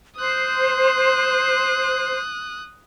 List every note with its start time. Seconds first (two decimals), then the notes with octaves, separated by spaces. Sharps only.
0.17 C5 D#6 F#6